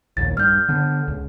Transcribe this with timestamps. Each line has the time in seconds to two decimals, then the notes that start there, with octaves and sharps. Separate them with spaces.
0.17 A#1 D#2 A6
0.37 G2 F6 G6
0.69 D3 B3 D4
1.08 C#2